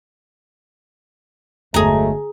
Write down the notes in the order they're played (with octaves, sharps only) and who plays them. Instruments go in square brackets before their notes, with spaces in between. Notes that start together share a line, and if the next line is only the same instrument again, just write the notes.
[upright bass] G1 E2 [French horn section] F#3 G#3 A3 [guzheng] G#4 A#5